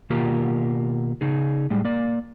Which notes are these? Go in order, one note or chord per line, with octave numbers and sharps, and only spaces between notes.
B2 D#3 A#3 F4 G4 A#4
C#3 D#4 G#4
A2 G3 G#3
A#3 D5